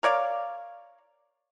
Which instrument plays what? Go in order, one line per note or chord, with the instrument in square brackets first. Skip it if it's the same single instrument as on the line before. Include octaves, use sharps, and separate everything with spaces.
[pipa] A#4 C#5 D5 F5